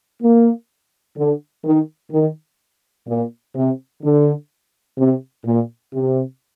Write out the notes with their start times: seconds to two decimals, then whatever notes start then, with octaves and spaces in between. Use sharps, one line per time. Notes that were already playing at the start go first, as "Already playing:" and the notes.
0.22 A#3
1.17 D3
1.65 D#3
2.12 D#3
3.07 A#2
3.55 C3
4.03 D3
4.98 C3
5.45 A#2
5.93 C3